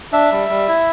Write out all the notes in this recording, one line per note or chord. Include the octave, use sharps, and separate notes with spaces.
D4 E5
G3
G3
E4